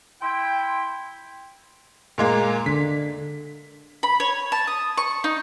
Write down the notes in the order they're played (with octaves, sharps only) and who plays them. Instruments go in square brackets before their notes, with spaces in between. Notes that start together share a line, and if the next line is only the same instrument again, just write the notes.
[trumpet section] E4 G5 [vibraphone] C6
[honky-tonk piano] A#2 G#3 A#3
[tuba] D3 [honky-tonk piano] B6
[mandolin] B5
C#5
A5
D#6
C#6
D#4